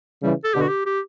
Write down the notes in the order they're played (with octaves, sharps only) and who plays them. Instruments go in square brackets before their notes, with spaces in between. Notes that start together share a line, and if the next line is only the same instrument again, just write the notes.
[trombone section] C#3 E3 [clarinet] G3
[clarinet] A4
[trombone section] B2 D3 [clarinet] G4
[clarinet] F#4
G4
G4